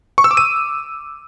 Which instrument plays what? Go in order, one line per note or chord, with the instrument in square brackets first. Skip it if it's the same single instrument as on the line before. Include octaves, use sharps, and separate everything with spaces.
[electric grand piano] C#6
E6
D6
D#7